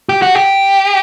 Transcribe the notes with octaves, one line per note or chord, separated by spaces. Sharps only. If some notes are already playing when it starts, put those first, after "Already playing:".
G4
F#4
G4